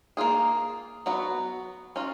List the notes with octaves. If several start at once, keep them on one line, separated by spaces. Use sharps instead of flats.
A#3 F4 G#4
F#3 B3 F#4
F#3 C#4 F4